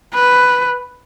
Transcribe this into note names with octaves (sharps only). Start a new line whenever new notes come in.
B4